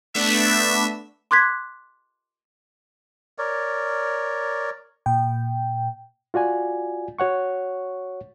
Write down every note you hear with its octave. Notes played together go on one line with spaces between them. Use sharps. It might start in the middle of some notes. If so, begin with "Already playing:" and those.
A3 B3 D4 E5
C6 D6 F#6 G#6 B6
A#4 C#5 D5
A#2 G5
F4 F#4 D5 G#5
F#4 C#5 F#5 C#6